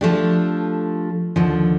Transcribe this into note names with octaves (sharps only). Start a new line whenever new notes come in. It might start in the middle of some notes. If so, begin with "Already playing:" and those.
F3 A3 D4 G4
D#2 D3 F3